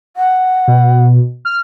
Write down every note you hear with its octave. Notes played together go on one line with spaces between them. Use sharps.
F#5
B2
F6